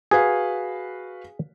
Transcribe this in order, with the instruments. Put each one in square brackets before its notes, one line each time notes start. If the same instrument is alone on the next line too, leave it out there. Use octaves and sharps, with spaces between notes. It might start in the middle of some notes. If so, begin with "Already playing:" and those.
[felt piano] F#4 B4 F5 [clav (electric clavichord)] G#4